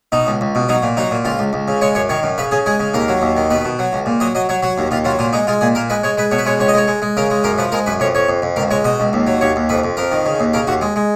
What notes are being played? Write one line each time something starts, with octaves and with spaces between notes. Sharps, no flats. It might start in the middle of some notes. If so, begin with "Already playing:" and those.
B2 D#4
C#2
C#2
B2
F#3 D#4
A#2
F#3 D#4
A#2
C#2 F4
C#2
C#2
C#3
G#3 C#5
F#2 C#5
D#3 C#5
F#2
C#3 B4
C#3 G#4
G#3 G#4
C#3
D#2 A#4
F#3
D#2
D#3
B2 B4
B2
F#3
C#2
A#2
F#3 D#5
F#3 D#5
F#3 C#5
F#3 F#4
D#2
D#2 F4
F#3 F4
A#2 F4
G#3 D#4
G#3 F4
A#2 G#4
A#2 A#4
G#3 B4
G#3 C#5
G#3 B4
B2 C#5
B4
G#3 C#5
C#2 C#5
D#5
G#3 C#5
G#3
G#3
C#3 A#4
G#3
F#2 A#4
F3 B4
G#3 A#4
F#2 B4
F2 C#5
F2 C#5
F2
F2
C#2 A#4
G#3 C#5
B2 D#5
C#2
D#2
F#3
D#2 C#5
D#2
F2 B4
F2
F2 A#4
D#3
C#3
D#2
C#3 A#4
D#2 F#4
G#3
G#3